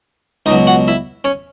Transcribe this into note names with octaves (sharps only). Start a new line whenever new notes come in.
C#2 B2 F#3 D#4 D#5
F#4 F#5
E4 E5
C#4 C#5